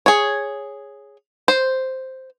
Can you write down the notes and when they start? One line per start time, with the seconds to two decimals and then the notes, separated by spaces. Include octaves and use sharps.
0.06 G#4 C#5
1.48 C5